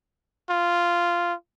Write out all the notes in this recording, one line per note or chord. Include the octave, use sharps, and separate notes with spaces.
F4